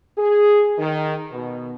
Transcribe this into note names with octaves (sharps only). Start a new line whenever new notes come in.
G#4
D#3
B2